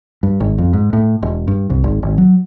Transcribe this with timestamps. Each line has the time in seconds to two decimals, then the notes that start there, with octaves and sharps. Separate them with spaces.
0.23 G2
0.40 G#1
0.58 F2
0.73 G#2
0.93 A2
1.23 E1
1.48 G2
1.70 C2
1.84 G#1
2.03 G#1
2.18 F#3